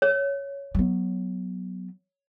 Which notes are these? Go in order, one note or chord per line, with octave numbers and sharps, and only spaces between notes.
C#5
F#3 B3